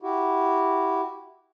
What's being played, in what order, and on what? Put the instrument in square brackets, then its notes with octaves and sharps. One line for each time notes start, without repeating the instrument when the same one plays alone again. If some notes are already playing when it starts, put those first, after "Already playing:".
[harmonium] E4 F#4 G4